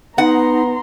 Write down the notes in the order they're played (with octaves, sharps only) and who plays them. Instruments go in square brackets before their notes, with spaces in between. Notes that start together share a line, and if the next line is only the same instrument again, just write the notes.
[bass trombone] B3 [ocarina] D#4 [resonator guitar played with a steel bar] F#5 [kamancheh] A#5 C6